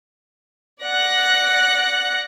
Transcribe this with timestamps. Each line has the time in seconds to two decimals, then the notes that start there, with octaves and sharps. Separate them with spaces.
0.83 D5 F#5 F#6 A#6 C#7